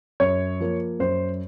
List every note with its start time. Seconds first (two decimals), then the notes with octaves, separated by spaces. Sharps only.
0.20 F#2 C#5
0.60 F3 A#3
0.99 F#2 C5